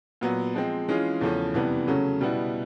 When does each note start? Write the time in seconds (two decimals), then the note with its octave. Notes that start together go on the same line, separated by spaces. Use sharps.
0.21 A#2 F#3 B3
0.55 F3 G#3 C4
0.88 E3 G#3 C#4 F4 G#4
1.21 E2 C#3 F3 A3 C#4
1.54 F2 C3 E3 G3 B3
1.87 C#3 F#3 A3 C#4
2.21 B2 G3 B3 E4